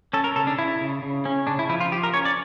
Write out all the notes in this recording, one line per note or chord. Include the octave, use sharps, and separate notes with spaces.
C#4 A4
A#4
C#3 A4
D4
C#3 E4
C#3
C#3
C#4
C#3 D4
E4
F3 E4
F4
F3 G4
A#4
C#4 C#5
D5